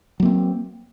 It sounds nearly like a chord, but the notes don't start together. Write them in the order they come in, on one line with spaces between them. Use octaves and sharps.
F#3 A#3 C4